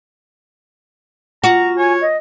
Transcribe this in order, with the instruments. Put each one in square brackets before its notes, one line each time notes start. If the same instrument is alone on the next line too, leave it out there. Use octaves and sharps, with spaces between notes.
[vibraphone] F4 [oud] F#4 [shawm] A#5
[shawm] C#5 [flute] G#5
[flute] D#5